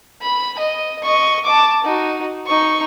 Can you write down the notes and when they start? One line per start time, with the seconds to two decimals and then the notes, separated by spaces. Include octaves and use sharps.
0.22 B5
0.59 D#5
1.03 D#5 C#6
1.45 A5 D6
1.84 D#4 F#4
2.47 D#4 C#6